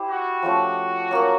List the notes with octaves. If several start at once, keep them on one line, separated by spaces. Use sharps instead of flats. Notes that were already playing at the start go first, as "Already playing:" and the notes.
Already playing: E4 G4 C5
F#4
F3 A3 C#4
F#3 A#3 C#4